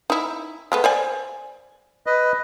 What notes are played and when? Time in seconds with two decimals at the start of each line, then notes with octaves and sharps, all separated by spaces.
0.10 D#4 E4
0.72 G#3 A3 B3
0.84 C5 D5 G#5
2.07 B4 D#5